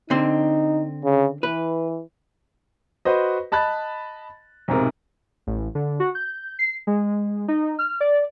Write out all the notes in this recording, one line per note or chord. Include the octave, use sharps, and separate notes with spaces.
D3 C4 D#4
C#3
E3 B4
F#4 B4 C5 D#5
D#5 A5 B5 F#6 A6
B1 G#2 C3 A#4
A1
D3
F#4
G6
C7
G#3
D#4
F6
D5